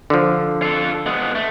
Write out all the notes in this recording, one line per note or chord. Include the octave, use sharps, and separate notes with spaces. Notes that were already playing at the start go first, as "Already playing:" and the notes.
D3 F3
F4 A4
G#3 B3
A3